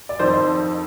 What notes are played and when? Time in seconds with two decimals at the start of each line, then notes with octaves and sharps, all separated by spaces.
0.09 D5
0.19 F2 D#3 C5
0.34 C5